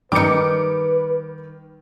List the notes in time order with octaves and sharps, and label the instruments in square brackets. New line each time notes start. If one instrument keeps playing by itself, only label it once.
[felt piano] D#3 [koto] G3 D#4 [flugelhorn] B4 [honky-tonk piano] D6 C#7